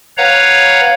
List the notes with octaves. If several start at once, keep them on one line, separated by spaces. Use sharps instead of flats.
B4 C#5 F5 F#5 A#5